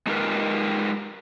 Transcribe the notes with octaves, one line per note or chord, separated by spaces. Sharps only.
G#3 D#4 F4 G4 A#4 B4